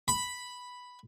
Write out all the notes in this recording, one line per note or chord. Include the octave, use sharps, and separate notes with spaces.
B5